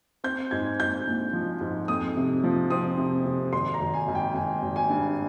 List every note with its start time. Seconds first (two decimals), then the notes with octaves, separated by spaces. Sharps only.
0.24 C4 G6
0.51 G#2 G#6
0.80 G#2 G6
1.07 A#1
1.33 F3
1.61 G#2
1.88 F2 D#6
2.16 C3
2.44 F3
2.70 C4 D#6
2.98 C3
3.26 C3
3.53 G#1 C6
3.74 A#5
3.80 G#1
3.94 G#5
4.08 G#1
4.15 G5
4.34 G#1 G#5
4.62 G#1
4.76 G#5
4.90 G2